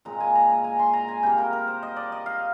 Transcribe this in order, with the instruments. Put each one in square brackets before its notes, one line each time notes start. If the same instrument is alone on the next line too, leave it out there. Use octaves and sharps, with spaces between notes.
[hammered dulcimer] A#2 G#3 C4 A#5
G#5
A#5
A#5
G#5
C6
A#5
G#5
C3 G3 A#3 G5
A#4
A#4
C5
D#5
D5
D#5
F5